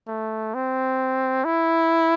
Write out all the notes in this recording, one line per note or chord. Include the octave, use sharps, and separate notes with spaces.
A3
C4
E4